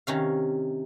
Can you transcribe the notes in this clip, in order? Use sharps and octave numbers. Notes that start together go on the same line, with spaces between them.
C3 D#3 C#4 F5